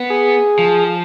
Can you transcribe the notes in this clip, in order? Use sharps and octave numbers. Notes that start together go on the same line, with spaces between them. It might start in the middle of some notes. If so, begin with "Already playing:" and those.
Already playing: B3
G#4
F3